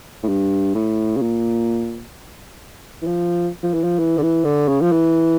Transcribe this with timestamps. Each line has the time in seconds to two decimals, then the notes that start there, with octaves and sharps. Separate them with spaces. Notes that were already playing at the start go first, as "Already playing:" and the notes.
0.23 A2
0.29 G2
0.75 A2
1.17 C#3
1.22 A#2
3.02 E3
3.07 F3
3.63 F3
3.74 E3
3.84 F3
3.99 E3
4.18 D3
4.23 E3
4.45 D3
4.68 C#3
4.81 F3
4.92 E3